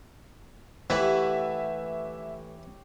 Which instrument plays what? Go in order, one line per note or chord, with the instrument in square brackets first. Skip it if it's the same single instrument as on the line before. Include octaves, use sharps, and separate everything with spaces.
[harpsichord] E3 [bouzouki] A3 B4 F#5 [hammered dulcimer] G4 C#5 [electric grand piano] E5